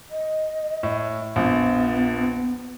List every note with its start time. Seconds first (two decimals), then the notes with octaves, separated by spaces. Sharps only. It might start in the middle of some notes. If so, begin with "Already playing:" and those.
0.11 D#5
0.83 A2
1.36 A#1 F2 B3